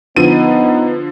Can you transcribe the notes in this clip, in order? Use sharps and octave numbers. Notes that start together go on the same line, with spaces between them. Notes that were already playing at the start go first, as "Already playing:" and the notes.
D3 F3 B3 D#4 D#7